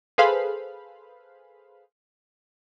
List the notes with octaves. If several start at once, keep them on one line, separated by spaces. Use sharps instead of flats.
G#4 A4 B4 C5 F5 B5